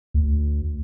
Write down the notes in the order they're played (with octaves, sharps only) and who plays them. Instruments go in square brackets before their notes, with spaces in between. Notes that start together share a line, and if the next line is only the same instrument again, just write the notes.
[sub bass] D2